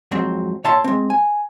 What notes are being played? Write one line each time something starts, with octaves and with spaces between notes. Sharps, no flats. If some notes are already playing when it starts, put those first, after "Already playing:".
F2 G#2 F#3 C4
A#2 C#5 E5 A5 C6
G#3 C4
G#5